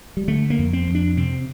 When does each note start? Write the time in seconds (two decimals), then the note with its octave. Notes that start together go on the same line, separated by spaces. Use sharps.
0.17 G3
0.28 D3 A3
0.50 A#3
0.58 F2
0.73 C4
0.87 F2
0.95 D4
1.17 C3 C4